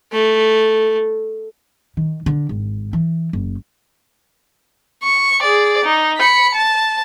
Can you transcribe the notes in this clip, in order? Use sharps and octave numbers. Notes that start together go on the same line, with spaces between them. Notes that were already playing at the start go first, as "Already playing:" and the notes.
A3
D#3
D3
G#1
E3
F#1
C#6
G#4 D5
D#4
B5 C#7
A5